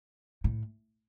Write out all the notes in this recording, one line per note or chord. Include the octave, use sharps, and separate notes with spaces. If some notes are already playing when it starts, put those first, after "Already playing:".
A2